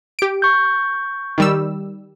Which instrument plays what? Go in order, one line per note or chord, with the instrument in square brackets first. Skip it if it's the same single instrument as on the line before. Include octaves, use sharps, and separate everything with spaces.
[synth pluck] G4 D7
[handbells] C#6 G6
[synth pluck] D#3 G3 E6